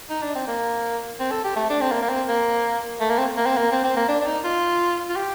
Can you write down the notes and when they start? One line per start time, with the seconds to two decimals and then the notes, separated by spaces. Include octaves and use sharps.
0.10 D#4
0.22 D4
0.35 C4
0.47 A#3
1.20 C4
1.31 A4
1.44 G4
1.56 A3
1.70 D4
1.81 C4
1.92 A#3
2.02 A#3
2.09 C4
2.28 A#3
3.00 A3
3.09 A#3
3.18 C4
3.37 A#3
3.46 C4
3.57 A#3
3.72 C4
3.84 C4
3.96 A#3
4.08 D4
4.20 D4
4.27 D#4
4.44 F4
5.09 F4
5.16 G4